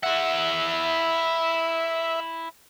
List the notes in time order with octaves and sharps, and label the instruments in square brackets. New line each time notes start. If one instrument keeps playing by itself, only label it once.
[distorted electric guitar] E4 F#5 [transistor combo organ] E5